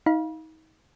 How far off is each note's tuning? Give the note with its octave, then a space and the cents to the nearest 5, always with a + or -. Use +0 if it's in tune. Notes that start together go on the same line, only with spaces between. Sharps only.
D#4 +30 F5 +0 B5 -40